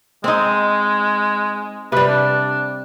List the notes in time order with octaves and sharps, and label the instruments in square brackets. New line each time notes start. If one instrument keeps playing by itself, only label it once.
[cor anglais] G#3 [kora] C4 D#4
[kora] C3 G3 [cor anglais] B4
[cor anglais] D4